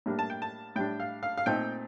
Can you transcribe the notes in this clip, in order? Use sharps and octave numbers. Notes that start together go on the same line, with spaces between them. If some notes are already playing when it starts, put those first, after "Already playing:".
A2 G3 A#3 D4
A5
G5
A5
A2 G3 D4 G5
F5
F5
F5
A#2 A3 C4 D#4 G5